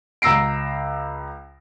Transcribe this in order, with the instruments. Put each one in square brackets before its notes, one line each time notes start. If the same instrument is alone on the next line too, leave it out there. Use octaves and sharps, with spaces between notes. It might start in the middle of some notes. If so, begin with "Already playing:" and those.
[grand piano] C#2 A#5 E6 A#6 C7 D7